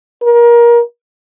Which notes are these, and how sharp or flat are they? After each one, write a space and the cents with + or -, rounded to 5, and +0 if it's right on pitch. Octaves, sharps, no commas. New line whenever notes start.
A#4 +25